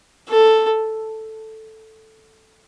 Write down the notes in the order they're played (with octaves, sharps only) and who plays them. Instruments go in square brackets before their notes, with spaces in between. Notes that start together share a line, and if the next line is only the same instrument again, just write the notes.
[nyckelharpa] A4